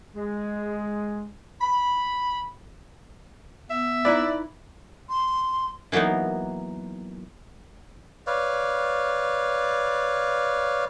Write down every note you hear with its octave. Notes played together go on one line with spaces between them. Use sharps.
G#3
B5
B3 E5
D#4 E4 B4 D5
C6
E3 F#3 A#3 B3 D#4
B4 C#5 D5 F5